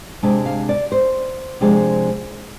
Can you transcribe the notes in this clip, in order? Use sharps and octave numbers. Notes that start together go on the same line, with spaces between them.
C3 G#3 D4
F5
D5
C5
C3 F3 G#3 D4